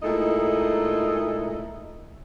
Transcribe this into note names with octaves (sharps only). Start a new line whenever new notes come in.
A#2 G#3 A3 D#4 E4 D#5